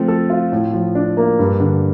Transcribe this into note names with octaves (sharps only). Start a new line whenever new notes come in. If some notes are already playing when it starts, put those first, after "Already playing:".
Already playing: F3 A3 C4
A4
F4
A2
F3
D4
A#3
G2
D3